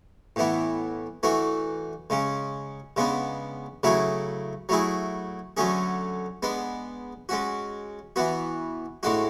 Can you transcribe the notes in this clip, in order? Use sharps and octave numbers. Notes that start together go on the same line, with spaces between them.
A2 E3 B3 E4
E3 A3 D4 F#4
C#3 G#3 C#4
C#3 G#3 B3 D4
C#3 F#3 A3 E4 G#4
F#3 A3 E4 G#4
D3 F#3 A3 C#4 G#4
G#3 B3 D4
G#3 C#4 F#4
E3 B3 F#4
A2 G#3 D4 F#4